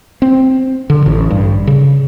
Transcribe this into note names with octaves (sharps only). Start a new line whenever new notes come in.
C4
D3
A1
G2
C#3